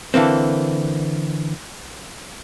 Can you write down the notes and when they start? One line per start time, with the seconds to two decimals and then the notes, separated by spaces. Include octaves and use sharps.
0.14 D3 E3 A#3 C4